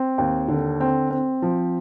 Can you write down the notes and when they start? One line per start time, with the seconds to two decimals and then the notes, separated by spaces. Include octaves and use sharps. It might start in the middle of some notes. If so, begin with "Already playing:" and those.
Already playing: C4
0.18 D#2
0.48 D3
0.80 C4
1.11 C4
1.42 F3